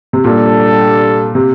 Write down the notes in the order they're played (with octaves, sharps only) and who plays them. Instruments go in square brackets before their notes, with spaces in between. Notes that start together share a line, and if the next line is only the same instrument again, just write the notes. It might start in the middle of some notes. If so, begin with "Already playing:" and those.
[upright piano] C3
[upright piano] A#2 [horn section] G3 D4 A4
[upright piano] C3